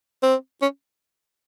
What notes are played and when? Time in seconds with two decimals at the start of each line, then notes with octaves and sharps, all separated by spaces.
0.23 C4
0.62 C#4